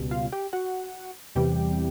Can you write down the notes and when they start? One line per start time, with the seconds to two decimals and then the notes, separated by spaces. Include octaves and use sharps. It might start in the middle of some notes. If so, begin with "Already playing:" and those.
Already playing: C#2 B2 G3
0.11 F4 F5
0.32 G4 G5
0.53 F#4 F#5
1.35 E2 C3 E3 G3 G4 G5